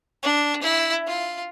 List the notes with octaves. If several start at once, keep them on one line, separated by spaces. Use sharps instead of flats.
D4
E4
F4